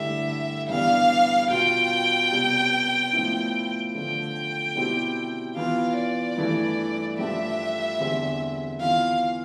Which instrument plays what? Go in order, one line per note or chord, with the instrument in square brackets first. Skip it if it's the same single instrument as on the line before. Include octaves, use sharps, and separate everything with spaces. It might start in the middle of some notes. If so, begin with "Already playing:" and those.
Already playing: [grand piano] G2 D3 A3 E4 G4 [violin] E5
[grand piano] G2 E3 B3 D4 G4 [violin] F5
[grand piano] B2 B3 F4 [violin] G5
[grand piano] C3 G3 B3
A2 F3 B3 E4
[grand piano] D3 F3 A3 [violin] G5
[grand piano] B2 G3 C4 E4 G4
[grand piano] E3 B3 F4 [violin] F5
[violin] D5
[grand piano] G2 E3 A3 E4
[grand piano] G2 F3 A3 D4 G4 [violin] E5
[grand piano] E2 D3 G3 C4
[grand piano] E3 B3 F4 [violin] F5